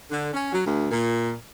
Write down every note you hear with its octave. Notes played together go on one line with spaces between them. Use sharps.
D3
C#4
F#3
D2
A#2